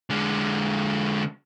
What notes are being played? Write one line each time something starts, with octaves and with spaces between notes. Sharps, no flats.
D3 G#3